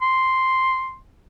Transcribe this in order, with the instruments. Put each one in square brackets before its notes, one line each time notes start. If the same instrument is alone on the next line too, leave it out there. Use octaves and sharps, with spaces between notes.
[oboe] C6